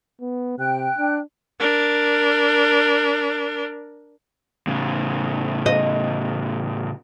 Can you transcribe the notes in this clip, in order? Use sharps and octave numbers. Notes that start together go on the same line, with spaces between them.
B3
C3 G5 F#6
D4
D4 A#4
A2 C#3
D#5